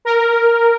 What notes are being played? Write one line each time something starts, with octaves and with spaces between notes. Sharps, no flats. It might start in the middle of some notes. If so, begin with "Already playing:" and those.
A#4